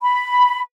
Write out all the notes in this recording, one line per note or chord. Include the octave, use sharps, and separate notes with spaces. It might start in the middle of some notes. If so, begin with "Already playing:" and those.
B5